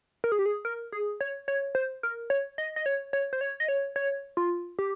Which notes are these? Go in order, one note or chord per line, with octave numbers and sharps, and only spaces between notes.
A#4
G#4
G4
G#4
A#4
G#4
C#5
C#5
C5
A#4
C#5
D#5
D#5
C#5
C#5
C5
C#5
D#5
C#5
C#5
F4
G4